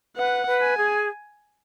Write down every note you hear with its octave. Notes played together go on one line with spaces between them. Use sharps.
B4 F#5
B4
G#5
G#4